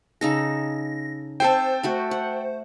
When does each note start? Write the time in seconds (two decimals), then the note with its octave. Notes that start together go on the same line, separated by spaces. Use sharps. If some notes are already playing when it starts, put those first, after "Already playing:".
0.21 C#3 D#4 A4 A#6
1.40 C4 A4 C5 G5 A5 C6
1.83 A3 F#4 B5
2.11 F#5